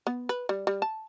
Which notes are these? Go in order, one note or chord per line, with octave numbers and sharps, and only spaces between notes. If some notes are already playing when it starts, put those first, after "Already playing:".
B3
B4
G3
G3
A5